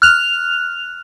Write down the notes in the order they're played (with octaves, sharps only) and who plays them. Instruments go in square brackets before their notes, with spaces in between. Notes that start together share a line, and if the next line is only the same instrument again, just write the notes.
[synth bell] F6 F#6 F7